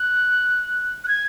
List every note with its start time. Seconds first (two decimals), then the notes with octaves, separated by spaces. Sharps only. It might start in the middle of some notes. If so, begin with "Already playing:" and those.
Already playing: F#6
1.04 F#6
1.08 G#6